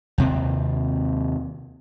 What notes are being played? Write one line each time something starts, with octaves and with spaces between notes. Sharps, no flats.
D#2 C3 C4